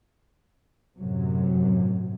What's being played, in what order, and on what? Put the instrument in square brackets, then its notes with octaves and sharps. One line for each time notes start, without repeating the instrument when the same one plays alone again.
[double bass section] F#2 A2 C3 F#3